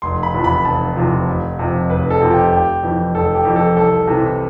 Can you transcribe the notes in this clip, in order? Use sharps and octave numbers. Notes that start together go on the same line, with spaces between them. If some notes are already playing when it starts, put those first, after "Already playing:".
F1 C6
B5
E2 C3 F3
B5
F1 A5
E2 C3 F3
F1
F2 C3 F3
F1 B4
A4
F2 C3 F3
G4
F1 G4
F2 E3
F1 A4
G4
F2 E3
A4
C2 A4
C3 E3